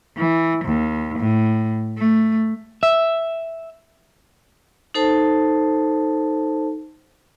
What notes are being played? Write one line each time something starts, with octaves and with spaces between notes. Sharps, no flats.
E3
D#2
A2
A3
E5
D#4 A4 C5 A5